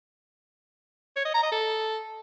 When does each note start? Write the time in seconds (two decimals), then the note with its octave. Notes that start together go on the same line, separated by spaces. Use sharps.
1.16 C#5
1.25 D#5
1.34 A#5
1.43 D#5
1.52 A4